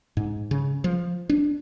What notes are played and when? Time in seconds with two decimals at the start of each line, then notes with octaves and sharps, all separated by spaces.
0.17 G#2
0.51 C#3
0.84 F3
1.29 D4